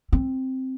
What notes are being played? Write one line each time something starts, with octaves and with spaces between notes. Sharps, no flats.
C4